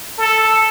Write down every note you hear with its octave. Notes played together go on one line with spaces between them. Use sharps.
A4